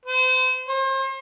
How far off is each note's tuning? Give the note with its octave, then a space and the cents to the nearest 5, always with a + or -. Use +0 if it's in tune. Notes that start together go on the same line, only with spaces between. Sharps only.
C5 -35
C5 +40